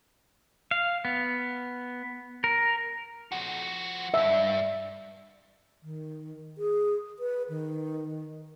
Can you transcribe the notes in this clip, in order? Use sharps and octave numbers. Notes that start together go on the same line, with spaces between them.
F5
B3
A#4
F3 F#4
B1 G2 E5
D#3
G#4
B4
D#3